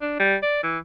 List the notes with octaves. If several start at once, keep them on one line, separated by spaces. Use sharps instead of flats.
D4
G3
D5
E3